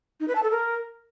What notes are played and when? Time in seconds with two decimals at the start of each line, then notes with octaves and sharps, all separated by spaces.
0.20 D#4
0.28 B4
0.35 A5
0.43 A4
0.51 A#4